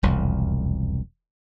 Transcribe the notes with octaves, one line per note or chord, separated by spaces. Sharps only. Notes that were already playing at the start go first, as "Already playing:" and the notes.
E1 C2 F2